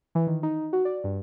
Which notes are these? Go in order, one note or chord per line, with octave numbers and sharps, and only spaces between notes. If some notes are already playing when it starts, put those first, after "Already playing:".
E3
D#3
D#4
F#4
D5
G2